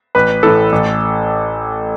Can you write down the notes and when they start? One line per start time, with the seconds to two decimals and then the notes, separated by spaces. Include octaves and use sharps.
0.15 A1 B4
0.43 A2 E3 A4
0.72 A1